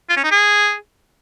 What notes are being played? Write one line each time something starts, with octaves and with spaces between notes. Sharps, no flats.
F4
C#4
D#4
G#4